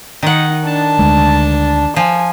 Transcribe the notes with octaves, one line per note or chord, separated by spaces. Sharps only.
D#3 D#4 F#5
D4 A5
D2 G#3
F3 G#5